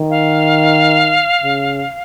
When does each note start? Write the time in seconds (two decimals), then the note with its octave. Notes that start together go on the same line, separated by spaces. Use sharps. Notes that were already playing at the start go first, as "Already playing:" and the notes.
Already playing: D#3
0.10 F5
1.44 C#3